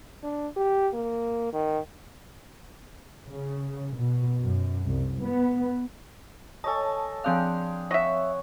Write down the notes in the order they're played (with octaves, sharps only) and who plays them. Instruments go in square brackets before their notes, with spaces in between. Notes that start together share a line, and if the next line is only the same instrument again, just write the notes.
[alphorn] D4
G4
A#3
D#3
[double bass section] C#3
B2
F#2
C2
B3
[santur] A4 C#5 D#5 [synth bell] G#5 A5
[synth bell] F3 C4 F5 [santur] D4 G#4 G5
[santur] C#5 F#5 C#6 [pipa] D#5 E5